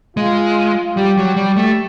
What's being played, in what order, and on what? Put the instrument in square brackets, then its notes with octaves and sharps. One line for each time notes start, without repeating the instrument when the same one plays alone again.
[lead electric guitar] G#3 [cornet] F4
[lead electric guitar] G3 [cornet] G4
[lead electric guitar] F#3
G3
A3